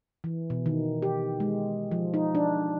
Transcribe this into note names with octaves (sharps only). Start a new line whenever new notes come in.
E3
B2
D#3
G4
G#3
F3
D#4
D4